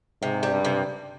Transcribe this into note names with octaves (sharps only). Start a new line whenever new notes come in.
G#2 C3
G3
G2
C3